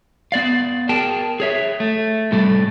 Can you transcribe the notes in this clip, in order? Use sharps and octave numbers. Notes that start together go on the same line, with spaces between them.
B3 D5 F5
G#4 A#4 G5 A5
G#4 C#5 E5
A3
A2 C3 G3 A4